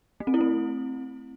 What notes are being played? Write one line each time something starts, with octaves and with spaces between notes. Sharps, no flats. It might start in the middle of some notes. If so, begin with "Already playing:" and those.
A3
C4
E4
C4